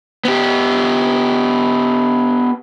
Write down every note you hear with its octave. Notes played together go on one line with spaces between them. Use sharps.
B3 G4